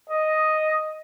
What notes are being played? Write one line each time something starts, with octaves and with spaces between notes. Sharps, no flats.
D#5